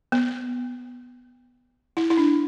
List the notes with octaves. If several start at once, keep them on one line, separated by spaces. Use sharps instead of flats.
B3
E4
E4
D4